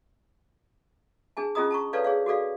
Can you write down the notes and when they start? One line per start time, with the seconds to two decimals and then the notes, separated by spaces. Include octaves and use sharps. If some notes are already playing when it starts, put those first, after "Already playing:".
1.37 D4 G#4 G#5 A5
1.55 C#4 F4 G#4 D#5 A#5 D#6
1.71 A5 A#5 C#6
1.93 A4 B4 C#5 D5 F5 A5
2.04 G#4 C#5 F5
2.26 F#4 G#4 A4 D5 F5